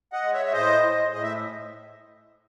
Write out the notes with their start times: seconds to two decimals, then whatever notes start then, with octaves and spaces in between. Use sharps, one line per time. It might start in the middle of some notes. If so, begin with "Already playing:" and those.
0.13 D#5 F#5
0.22 G#3
0.33 C#5 E5
0.46 E5
0.53 A2 C5 D#5
0.83 G#3
1.13 A2 D#5
1.23 E5